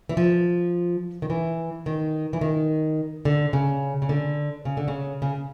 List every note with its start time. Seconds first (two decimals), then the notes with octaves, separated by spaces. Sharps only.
0.09 E3
0.17 F3
1.22 D#3
1.30 E3
1.86 D#3
2.33 E3
2.41 D#3
3.25 D3
3.53 C#3
4.02 C#3
4.09 D3
4.65 C#3
4.77 D3
4.88 C#3
5.22 C#3